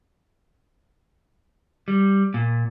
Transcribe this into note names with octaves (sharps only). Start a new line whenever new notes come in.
G3
A#2